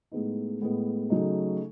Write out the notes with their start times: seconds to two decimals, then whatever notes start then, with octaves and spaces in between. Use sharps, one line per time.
0.12 A2 G#3 B3 D#4
0.62 A2 G#3 B3
1.10 C#3 F#3 A3 D#4